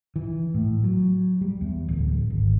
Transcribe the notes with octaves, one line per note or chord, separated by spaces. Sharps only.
E3
A2
F#3
G3
E2
D1
G#1